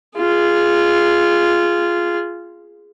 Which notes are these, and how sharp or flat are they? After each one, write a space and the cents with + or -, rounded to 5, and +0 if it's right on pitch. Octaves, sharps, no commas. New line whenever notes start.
F4 -10 G#4 +0